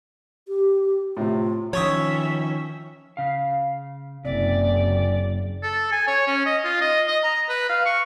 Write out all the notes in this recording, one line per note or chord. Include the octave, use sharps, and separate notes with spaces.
G4
A2 C3 F4
D#3 F3 C#4 C#5 E5 C#6 D#6
C#3 F5
F#1 C3 D5
A4
G#5
C#5
C#4
D#5
F4
D#5
D#5
A#5
B4
F5
C#6